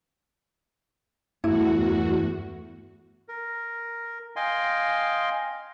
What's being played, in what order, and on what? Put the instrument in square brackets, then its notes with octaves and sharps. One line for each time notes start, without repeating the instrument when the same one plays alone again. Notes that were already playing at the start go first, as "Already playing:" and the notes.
[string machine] E2 F#4 [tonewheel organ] G2 A3 [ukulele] E4
[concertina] A#4
D#5 F5 G5 G#5 C6